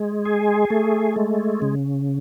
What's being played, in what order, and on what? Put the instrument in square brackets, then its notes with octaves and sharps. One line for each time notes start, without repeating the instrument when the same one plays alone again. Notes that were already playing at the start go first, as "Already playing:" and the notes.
Already playing: [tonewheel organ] G#3
G#4
A3
G#3
C#3